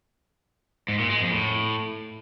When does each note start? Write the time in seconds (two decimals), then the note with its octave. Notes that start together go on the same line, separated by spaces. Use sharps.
0.88 G#2
0.99 A#2
1.10 G#3
1.20 F2
1.31 A2